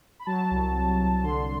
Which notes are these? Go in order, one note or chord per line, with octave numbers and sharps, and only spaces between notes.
B5
F#3 A5
C2
C2
C2
D3 C6